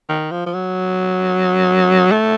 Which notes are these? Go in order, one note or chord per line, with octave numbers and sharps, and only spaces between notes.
D#3
F3
F3
F#3
A3